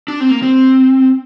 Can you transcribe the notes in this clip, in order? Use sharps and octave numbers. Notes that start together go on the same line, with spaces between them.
D4
C4
A#3
C4